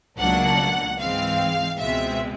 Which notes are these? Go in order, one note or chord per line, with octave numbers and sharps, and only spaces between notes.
C#2 B2 F#3 A#3 D4 F#5
G#2 E3 G#3 C4 F5
C#2 B2 G#3 C4 E5